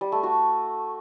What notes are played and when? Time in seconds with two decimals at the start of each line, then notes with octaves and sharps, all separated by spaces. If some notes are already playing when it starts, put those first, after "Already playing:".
0.01 G3
0.12 A3
0.23 F#4